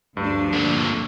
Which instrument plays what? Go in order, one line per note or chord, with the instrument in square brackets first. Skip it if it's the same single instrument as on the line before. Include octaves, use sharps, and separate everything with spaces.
[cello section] D2 F3 D4 [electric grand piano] G2
[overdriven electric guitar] A#2 D3